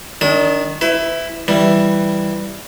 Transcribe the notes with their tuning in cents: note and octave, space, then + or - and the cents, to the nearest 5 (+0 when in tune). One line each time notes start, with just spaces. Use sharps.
D#3 +0 D4 -30 D#6 +35
E4 +0 B4 +35
E3 +5 G3 +0